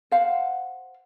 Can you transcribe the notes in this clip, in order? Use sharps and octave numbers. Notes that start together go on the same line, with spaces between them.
C5 F5 F#5